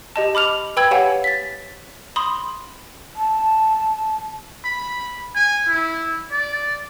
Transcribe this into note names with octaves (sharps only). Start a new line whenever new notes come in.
G4 D#5 A5
B5 D6 F6 F7
B4 G5 B5 E6 G#6
G4 C#5 F5 F#5 G#5
A6 B6
B5 C6 D#6
A5
B5
G#5
E4
D5